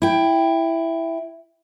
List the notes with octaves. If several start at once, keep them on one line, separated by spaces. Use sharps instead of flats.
E4 G5